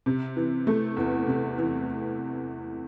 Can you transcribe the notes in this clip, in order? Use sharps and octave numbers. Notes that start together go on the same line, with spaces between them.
C3
E3
A3
E2
C3
E3